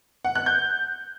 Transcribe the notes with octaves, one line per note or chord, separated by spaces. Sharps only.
F#5
F#6
G6